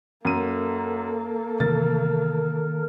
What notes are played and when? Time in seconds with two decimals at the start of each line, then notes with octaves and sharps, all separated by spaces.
0.25 F#2 A#3 A4 D#7
1.60 C3 D#3 E3 A3 A#4 A6